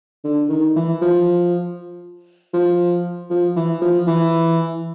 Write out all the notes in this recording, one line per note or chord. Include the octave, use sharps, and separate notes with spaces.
D3
D#3
E3
F3
F3
F3
E3
F3
E3